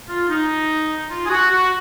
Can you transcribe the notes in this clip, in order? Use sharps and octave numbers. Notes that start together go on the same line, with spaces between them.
F4
D#4
F4
G#4
F#4
F#4